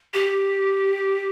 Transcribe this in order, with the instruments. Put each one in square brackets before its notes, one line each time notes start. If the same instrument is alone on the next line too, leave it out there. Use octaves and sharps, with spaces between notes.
[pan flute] G4